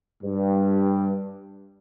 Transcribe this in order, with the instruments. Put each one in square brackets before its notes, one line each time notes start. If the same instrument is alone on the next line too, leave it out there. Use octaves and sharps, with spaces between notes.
[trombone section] G2